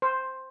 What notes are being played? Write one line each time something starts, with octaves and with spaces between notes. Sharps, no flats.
C5